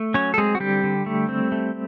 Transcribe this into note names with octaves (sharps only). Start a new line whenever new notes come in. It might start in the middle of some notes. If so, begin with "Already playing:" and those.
Already playing: A3
F#3 C#4 C#5
A4
G#3 C4 G#4
F#4
D3 G3 G4
D3
A3
C4
A3